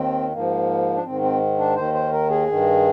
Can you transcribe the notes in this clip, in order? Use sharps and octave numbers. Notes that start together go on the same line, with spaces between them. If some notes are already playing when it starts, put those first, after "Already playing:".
Already playing: D#2 D#3 C4
G#2 F3 A#3
D4
G#2 D#3 C4
C4
D4
D#2 D#3 C5
C5
A#4
G#4
G2 D#3